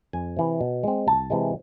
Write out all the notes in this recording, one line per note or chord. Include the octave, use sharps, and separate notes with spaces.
F2 G#5
C3 E3
B2
G#3 C4
C2 A5
C3 E3 G#3